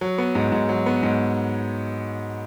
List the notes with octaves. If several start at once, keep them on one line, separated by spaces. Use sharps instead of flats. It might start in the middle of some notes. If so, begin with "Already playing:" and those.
F#3
B3
G#2
G#2
F#3
B3
G#2